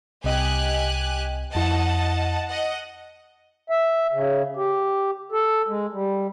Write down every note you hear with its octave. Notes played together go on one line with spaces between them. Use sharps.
C2 C3 G4 D#5 G#5 F#6
F2 E4 D#5 F#5 A5
D#5 F#5
E5
C#3
G4
A4
G#3
G3